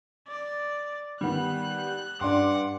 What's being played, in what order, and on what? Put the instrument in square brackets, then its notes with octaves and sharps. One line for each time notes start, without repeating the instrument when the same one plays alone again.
[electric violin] D5
[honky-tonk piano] D#3 B3 [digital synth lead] G3 [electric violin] F#6
[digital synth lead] G2 [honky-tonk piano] D4 C6 [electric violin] F#5 D6